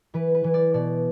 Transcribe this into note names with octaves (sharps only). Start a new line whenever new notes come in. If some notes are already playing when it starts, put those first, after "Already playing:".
E3 B4
B4
E3
D5
B2 D5